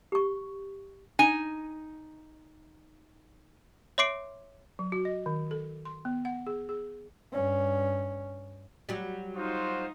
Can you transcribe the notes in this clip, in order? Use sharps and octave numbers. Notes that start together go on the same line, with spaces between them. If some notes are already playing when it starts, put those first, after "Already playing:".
G4 C#6
D#4 G#5
C#5 E5 C6 D6 C7 D7
F#3
F#4
D#5
D#3
A4
C6
B3
F#5
G#4
G#4
G2 C#4
F#3 G3
D#4 F4 F#4 C5